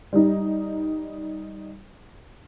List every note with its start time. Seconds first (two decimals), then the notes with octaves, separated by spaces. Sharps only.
0.13 G3 D#4